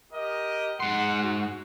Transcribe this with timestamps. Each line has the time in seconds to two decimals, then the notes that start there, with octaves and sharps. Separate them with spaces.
0.13 G4 A#4 D#5
0.80 G#2 F#5 C6
1.23 F#4